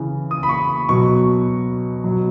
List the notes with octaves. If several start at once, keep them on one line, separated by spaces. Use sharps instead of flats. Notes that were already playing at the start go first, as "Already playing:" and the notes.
Already playing: C#3 E3
D#6
B5
C#6
B2 F#3 C#6
B2 F#3